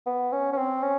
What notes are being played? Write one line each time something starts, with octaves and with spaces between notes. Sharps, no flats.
B3
C#4
C#4
C4
C#4